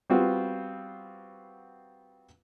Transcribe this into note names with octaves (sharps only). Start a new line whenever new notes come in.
G3 B3 C4 F4 F#4